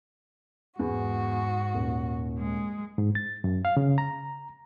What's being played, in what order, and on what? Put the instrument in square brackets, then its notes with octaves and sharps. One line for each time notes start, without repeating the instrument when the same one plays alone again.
[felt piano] E2 [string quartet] G#2 F#4
[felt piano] D#1
[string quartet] G#3
[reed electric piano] G#2
A6
F#2
F5
C#3
A#5